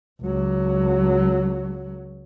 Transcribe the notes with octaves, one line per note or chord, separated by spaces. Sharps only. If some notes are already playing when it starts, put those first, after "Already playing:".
C#2 F#3